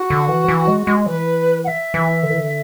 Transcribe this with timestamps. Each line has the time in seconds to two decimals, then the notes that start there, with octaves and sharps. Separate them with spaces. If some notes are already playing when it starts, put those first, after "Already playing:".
Already playing: F#4
0.10 D3
0.29 E3
0.48 E3
0.67 G#3
0.87 G#3
1.06 E3 B4
1.64 F#5
1.68 E5
1.94 E3
2.23 D3
2.30 E3
2.38 D3